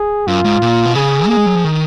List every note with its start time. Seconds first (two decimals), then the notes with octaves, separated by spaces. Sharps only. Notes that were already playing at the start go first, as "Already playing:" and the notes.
Already playing: G#4
0.27 F#2 F4
0.44 G#2
0.62 A#2
0.86 B2
0.95 C#3 G#4
1.27 A#3 G#4
1.37 G#3
1.46 F#3
1.55 F3
1.64 D#3